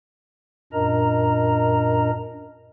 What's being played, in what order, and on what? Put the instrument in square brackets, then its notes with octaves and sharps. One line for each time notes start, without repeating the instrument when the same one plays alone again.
[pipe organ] F#2 A#2 D4 A#4 D#5 A#5